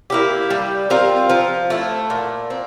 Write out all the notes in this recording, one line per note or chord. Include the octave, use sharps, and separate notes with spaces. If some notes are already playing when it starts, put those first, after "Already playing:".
A#3 E4 G4
G3
C4 F4 A#4
F3
A3 E4
A#2
C4